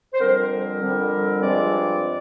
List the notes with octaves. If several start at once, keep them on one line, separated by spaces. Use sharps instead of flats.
C5
F2 D3 G3 C4 A#4
F2 D3 G3 C4
G2 F3 G#3 C4 D5